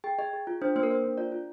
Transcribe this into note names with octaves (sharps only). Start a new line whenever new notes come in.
G#4 G5
G#4 D#5
G#4
F4
D4 C5
A#3 C5
A#4
A#3 C5
D4
F4 D5
F4